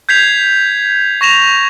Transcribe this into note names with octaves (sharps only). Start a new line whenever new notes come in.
G6 G#6 B6 C7 F7
C#6 A#6 E7 F7